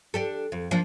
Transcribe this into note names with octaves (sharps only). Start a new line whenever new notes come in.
D4 G4 A4
F2
F3 A#3 D4